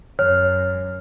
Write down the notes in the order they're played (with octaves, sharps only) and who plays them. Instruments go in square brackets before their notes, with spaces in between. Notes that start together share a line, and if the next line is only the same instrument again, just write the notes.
[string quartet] F#2 [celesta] C#5 [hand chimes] F6